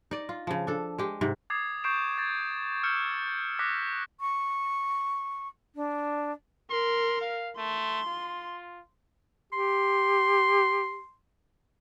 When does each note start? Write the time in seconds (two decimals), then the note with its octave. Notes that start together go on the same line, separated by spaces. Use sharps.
0.11 D#4 D5
0.29 F4
0.47 C#3 F3
0.67 D4 A4
0.98 G#3 G4
1.21 G#2 C3
1.50 D6 D#6 G#6 A6 C7
1.84 C#6 G6 C7 D7 E7
2.18 G#6 A6
2.83 E6 F6 G6 C#7 E7
3.59 D6 F#6 A#6 B6
4.20 C#6
5.75 D4
6.71 A#4 C6
7.21 F5
7.58 A3 C6
8.07 F4
9.53 G4 C6